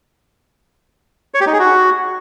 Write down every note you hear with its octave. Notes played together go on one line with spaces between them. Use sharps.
C#5
G4
D#4
G#4
F#4